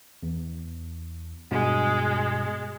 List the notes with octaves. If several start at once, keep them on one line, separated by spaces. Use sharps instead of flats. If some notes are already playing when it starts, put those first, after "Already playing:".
E2
G2 B2 G#3